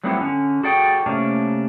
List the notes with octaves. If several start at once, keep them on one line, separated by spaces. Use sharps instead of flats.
F#3 G3 A3 B3 C4 E4
D3 C#4
F#4 G#4 A4 D5 G5
C3 A3 A#3 C#4 D4